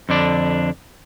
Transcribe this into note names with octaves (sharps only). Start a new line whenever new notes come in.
F2 D3 D4